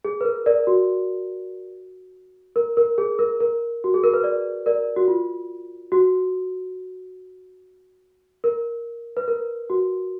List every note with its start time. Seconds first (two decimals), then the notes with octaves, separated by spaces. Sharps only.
0.05 G#4
0.21 B4
0.25 A#4
0.46 A#4 D5
0.67 F#4
2.56 A#4
2.77 A#4
2.98 G#4
3.19 A#4
3.40 A#4
3.84 F#4
3.94 G#4
4.04 A#4
4.14 B4
4.24 A#4 D5
4.66 A#4 D5
4.96 F#4
5.08 F4
5.92 F#4
8.44 A#4
9.17 B4
9.28 A#4
9.70 F#4